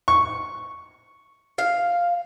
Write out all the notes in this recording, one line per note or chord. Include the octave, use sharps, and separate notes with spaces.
C#6
F5